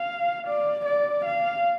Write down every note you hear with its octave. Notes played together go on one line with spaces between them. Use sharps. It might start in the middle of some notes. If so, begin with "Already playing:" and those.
Already playing: F5
D5
D5
F5